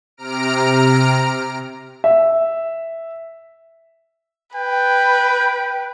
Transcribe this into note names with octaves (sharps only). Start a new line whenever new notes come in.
C3 A#5 F6 D7
E5
B4 G5